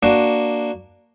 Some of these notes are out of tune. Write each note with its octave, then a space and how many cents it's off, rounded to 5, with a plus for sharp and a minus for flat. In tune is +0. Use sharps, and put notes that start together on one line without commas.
A#3 +0 D4 +0 F#4 +0